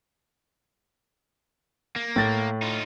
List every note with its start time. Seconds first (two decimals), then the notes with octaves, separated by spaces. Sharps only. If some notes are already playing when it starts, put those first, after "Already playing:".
1.96 A#3
2.16 A2 A6
2.62 D#4 F4